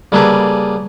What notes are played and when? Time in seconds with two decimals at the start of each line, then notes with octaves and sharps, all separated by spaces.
0.12 C#3 G3 A#3 G#4 A4 B4